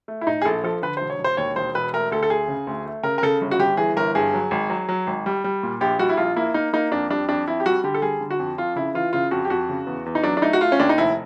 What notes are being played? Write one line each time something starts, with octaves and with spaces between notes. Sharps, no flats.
A3
E4
A2 D#4
G#4
A#1 A4
F3 A4
D3 B4
E1 C5
C#5
E1
C5
D#2 C#5
E1 C5
E1 B4
A3 A#4
D2 A4
A4
D2 G#4
C#3
D2
A3
C#3 A#4
A#4
C#3 A4
G1
F#4
G1 G4
E3 G#4
G1 A#4
G2 G#4
F#3
G#1
F#3
F#3
G#1
G3
G3
A#2
A#1 G4
G3 F#4
E4
A#1 F4
A#3 E4
A#3 D#4
A#3 D#4
F2 D4
G3 D4
F2 D4
F2 E4
G4
G3 F#4
D3 G4
A4
G3 G#4
D3
F#4
F2
F2 F4
C#3 E4
E3 F4
C#3 F4
F2 F#4
G4
F2 F#4
C#3
E2
E2
D#4
F#3 D4
D4
A3 D#4
F#4
A3 F4
C#4
D#2 D4
D#4
F1 E4